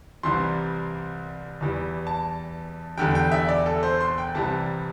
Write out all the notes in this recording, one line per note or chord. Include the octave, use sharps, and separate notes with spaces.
C2 C3 E3 G3 C6
E2 E3 G3
A5
E2 D3 G3 G5
G5
E5
D5
A4
C5
C6
G5
C2 C3 E3 G3 A5